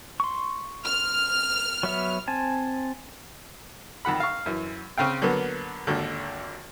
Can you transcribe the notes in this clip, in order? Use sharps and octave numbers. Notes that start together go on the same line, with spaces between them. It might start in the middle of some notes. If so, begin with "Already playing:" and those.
C6 C#6
F6
F#3 B3 E5
C4 G#5 A5
F2 D#3 F#5 B5
F5 C#6
F#2 E3
C#3 C4 F5 G5
D3 F#3 A#3 B3
G#1 D#2 D3